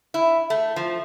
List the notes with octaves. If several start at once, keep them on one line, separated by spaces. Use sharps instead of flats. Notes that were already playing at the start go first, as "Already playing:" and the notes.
E4
A3
F3